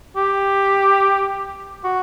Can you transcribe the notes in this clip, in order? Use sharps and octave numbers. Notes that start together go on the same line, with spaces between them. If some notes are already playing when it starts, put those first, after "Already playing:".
G4
F#4